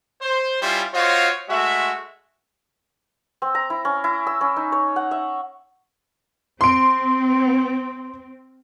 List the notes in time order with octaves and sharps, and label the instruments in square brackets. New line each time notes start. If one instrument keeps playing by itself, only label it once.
[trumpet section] C5
G3 C#4 E4 F4 C5
F4 F#4 C5 C#5 D#5 F5
G#3 A3 F#4 E5
[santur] C4
A#5
E4
C#4
E4
E6
C#4
D#4
C#5
F#5
E5
[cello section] C4 [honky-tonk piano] C6 D7